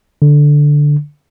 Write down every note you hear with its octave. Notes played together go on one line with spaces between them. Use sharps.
D3